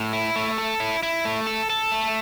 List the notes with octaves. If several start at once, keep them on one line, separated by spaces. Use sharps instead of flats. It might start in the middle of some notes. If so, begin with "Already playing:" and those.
Already playing: A2
E4
A3
A4
E4
E4
A3
A4
A4
A3